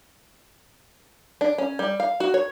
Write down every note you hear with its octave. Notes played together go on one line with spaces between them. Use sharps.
D4
C#4
G3
F5
F#4
C#5